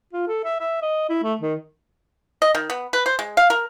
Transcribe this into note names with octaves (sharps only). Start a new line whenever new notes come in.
F4
A4
E5
E5
D#5
E4
A3
D#3
D#5
D#3
B3
B4
C5
G#3
F5
A#4